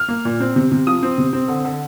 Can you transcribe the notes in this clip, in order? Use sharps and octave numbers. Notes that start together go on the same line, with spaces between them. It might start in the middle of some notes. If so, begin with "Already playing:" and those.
Already playing: F6
A#3
A#2
C4
C3
C3
F3 D#6
C4
C3
C4
D3
D3